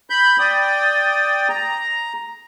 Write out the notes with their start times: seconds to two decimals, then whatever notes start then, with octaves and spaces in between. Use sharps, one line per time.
0.10 B5 G6
0.39 D5 G5 D#6
1.49 A#5